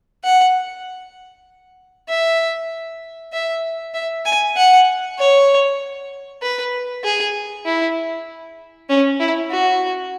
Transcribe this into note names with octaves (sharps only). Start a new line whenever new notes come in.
F#5
E5
E5
E5
G#5
F#5
C#5
B4
G#4
E4
C#4
E4
F#4